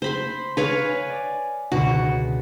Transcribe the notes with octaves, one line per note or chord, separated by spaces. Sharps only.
C5 B5 C6
B4 C#5 F5
G#5
D5
C#2 B2 D3 F#4